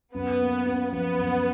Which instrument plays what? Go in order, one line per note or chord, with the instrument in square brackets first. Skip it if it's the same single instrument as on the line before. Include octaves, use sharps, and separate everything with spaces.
[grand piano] F#2 [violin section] B3
[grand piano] A#3
C#4
[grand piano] F3 [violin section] B3
[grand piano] F#2